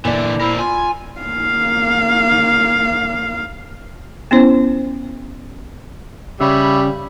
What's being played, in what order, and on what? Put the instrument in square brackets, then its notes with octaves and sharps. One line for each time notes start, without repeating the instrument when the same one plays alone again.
[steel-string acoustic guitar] A#2 D5 [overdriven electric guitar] D3 E3
[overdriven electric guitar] C4 A#4 [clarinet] E4
[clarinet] F4 [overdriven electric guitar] G#5
[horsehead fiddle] A#3 F5
[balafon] B3 C#4 E4 C5
[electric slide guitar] C#3 [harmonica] G3 [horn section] C#5 E5 B5